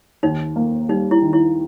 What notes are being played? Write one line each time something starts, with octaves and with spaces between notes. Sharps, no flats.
D#2 D#4
A#3
G3 D#4
E4
D#3
E4